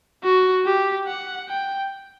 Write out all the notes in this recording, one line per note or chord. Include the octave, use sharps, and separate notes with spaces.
F#4
G4
F#5
G5